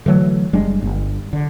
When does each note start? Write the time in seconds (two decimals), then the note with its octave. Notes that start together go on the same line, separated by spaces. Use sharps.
0.06 D3 E3 F#3 A3
0.53 F#1 G3 G#3 D4
0.82 G1
1.33 D3